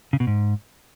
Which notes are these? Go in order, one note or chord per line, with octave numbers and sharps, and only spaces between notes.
C#3
B2
G#2